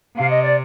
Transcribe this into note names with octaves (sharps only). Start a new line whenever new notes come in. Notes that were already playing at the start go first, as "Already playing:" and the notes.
C3 F5
D#5
D5